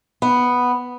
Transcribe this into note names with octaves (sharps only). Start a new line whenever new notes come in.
B3